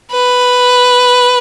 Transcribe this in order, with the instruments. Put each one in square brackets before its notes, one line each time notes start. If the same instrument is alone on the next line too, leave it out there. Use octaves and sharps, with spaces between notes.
[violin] B4